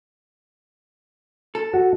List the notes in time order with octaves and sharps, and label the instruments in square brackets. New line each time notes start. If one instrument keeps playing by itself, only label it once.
[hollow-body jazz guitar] A4
[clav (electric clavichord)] F#4